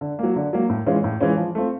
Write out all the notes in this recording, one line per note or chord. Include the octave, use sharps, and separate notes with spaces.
D3
F#3 A#3
D3
F#3 A#3
A2
E3 G#3 C#4 F4
A2
E3 G#3 C#4 F4
F3
A3 C4 F4